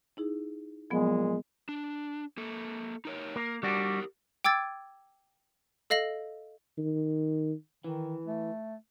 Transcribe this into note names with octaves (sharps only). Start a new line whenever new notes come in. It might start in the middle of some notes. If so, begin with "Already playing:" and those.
D#4 E4 G#4
A#2 F3 F#3 G#3 B3
D4
A#3 A4
D#4 A#4 C#5
A#3 A#4
G3 D4 F#4 G4 A#4
G5 D6 E6 G#6 A6
A4 D#5 F5 A#6 F#7
D#3
D#3 E3
A3